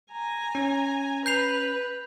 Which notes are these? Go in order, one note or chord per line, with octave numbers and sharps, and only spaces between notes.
G#5 A#5
C#4
B4 G6 C7 F7